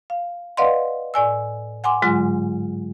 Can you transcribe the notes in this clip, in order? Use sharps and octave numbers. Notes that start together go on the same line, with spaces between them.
F5
B4 D5 D#5 F5 F#5 C6
A2 D5 G#5 E6
F#5 G#5 C6 D6
G#2 D3 F#3 G#3 F4